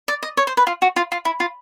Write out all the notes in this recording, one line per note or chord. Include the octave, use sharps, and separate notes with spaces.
D5
D#5
C#5
C5
B4
F4
F#4
F4
F4
E4
F4